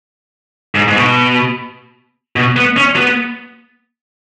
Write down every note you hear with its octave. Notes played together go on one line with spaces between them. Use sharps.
G#2
G#2
B2
B2
B3
C#4
B3